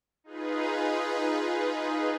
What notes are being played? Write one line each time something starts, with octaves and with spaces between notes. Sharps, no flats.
D#4 F4 G#4 B4